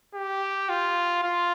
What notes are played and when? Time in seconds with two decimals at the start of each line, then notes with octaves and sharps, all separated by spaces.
0.15 G4
0.69 F4
1.24 F4